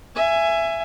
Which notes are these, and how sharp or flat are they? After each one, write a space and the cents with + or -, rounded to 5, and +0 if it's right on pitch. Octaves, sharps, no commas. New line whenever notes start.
E5 +20 G#5 +0